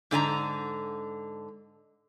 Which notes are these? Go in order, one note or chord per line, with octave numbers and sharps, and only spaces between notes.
G#2 D3 G#5 A#5